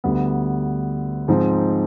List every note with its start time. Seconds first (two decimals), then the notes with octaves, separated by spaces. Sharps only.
0.04 D2 D3 G3 B3
1.28 G#2 F3 C4 D#4